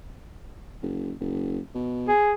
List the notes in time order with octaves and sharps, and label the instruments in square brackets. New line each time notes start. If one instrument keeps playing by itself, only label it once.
[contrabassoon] F#1
F#1
B2
[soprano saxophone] G#4